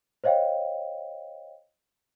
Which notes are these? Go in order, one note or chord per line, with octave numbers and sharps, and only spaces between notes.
C5 C#5 D#5 F5 G5